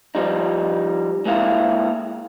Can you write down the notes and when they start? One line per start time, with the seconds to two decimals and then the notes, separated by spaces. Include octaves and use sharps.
0.15 F3 G3 D#4
1.26 G#3 A#3 E4 F5